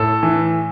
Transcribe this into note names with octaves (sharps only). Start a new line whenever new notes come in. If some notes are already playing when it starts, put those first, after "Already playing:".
Already playing: A2 A4
E3